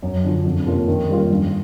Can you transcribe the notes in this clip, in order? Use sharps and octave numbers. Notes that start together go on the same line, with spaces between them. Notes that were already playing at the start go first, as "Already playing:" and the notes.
F#2
D3 F3
F2
C3 F3 A#3 C#4
D#3
G3 A#3 C#4 F4
G2